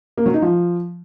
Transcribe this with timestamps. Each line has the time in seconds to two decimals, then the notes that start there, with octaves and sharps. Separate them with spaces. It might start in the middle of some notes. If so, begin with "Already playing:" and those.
0.18 A#3
0.26 F#3
0.34 D#4
0.42 F3